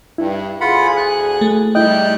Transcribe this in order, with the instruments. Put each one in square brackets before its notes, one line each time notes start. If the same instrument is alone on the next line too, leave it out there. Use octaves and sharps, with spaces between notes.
[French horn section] G2 [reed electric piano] E4
[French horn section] D2 G#4 [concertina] F4 F#5 B5
[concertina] F#6
[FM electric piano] A3
[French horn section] G#2 C3 G3 [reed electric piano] E4 D#5 [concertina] G5 F#6